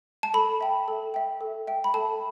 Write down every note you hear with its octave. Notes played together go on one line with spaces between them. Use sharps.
A5
A4 B5
E5 G5
A4
E5 G5
A4
E5 G5
B5
A4 A5